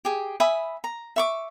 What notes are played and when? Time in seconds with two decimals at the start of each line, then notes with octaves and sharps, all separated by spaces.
0.05 G4 G#4
0.40 E5 G#5 B5 D#6
0.84 A#5
1.16 E5 C#6 D6